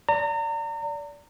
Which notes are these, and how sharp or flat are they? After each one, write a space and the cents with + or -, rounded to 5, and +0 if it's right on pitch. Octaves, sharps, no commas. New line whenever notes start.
D5 -20 A#5 -35